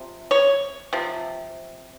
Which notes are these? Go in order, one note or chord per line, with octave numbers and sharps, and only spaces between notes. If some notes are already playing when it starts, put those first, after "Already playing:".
Already playing: C3 F3
C#5
C3 F3